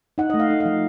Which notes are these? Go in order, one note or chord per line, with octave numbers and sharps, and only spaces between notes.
D#4 F#5
A3 D#5
F5
D#4
F5
F3